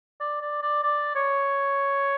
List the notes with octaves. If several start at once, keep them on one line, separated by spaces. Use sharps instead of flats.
D5
D5
D5
D5
C#5